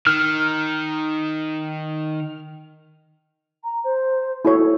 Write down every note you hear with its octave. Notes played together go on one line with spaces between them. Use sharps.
D#3 F6
A#5
C5
E4 F#4 A4 C#5